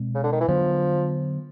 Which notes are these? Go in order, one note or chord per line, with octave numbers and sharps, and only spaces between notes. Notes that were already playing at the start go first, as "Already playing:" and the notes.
Already playing: B2 G#3 C4
C#3
D3
D#3
E3
D3 F3 F#3 B3 D4